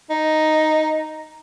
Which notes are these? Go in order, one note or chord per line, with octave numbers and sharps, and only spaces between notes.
D#4